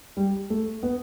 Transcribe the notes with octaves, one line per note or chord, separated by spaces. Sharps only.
G3
A3
B3